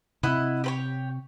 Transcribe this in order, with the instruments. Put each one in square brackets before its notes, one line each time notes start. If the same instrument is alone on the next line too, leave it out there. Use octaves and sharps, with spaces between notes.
[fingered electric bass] C3 C4 [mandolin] E4 D#5 F#5
[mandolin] G4 B4 C#5